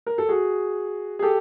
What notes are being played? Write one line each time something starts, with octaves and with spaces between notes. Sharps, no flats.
A#4
A4
F#4 G#4
G#4
G4 A4